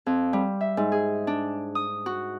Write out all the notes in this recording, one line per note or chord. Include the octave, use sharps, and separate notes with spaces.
F2
G3
E5
G#2
G#4
D4
D#6
F#4